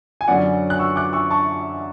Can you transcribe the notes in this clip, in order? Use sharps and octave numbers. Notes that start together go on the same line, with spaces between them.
G#5
F#2 D3 F#3 C#4 D5 F#5
F#6
C#6 E6
D6 F#6
C#6 E6
A5 C#6